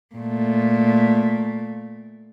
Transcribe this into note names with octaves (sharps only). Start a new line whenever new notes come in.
A#2 A3